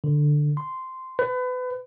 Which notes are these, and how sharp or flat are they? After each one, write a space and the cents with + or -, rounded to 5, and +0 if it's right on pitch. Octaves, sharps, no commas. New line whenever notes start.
D3 +10
C6 -10
B4 +30